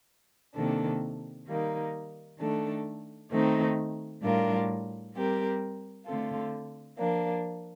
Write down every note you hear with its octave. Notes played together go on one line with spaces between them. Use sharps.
C3 D#3 A#3 D4 A4
D#3 G3 A#3 D#4
D#3 A3 D4 A4
D#3 A3 C4 D#4
A2 G3 D4 F4 A#4
G3 C4 G4 A#4
D3 A3 C4 F4 A4
F3 A#3 D4